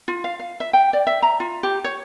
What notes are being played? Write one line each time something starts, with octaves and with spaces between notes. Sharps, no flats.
F4
F5
F5
E5
G5
D5
E5
A#5
F4
G4
C#5